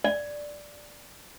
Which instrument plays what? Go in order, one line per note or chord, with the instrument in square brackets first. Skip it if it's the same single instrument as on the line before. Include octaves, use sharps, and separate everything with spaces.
[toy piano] D5